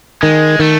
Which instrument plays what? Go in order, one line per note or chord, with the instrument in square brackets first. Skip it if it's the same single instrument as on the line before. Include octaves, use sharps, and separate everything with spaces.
[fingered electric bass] D#3 [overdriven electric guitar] G#3
[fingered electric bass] D#3 [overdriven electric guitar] A3